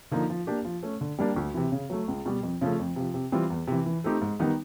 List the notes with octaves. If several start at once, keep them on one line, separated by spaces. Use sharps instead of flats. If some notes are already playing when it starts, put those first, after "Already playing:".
D3 F3 A#3 D#4
F3
A#3 D4 G4
F3
A3 C#4
D3
G3 A#3 D4
D2
C3 E3
C#3
F#3 A3
C#2
B2 G3
F2
C#3 F3 A3
F2
C3 F3
C3
E3 G3 C4 F4
E2
C3 E3
E3
A3 C4 D#4 G4
G#2
D#3 G3 B3 D#4